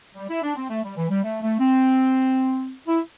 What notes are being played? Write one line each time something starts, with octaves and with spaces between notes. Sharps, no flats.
G3
E4
D4
C4
A3
G3
E3
G3
A3
A3
C4
E4